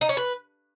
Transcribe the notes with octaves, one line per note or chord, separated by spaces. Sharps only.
D#4
C#4
B4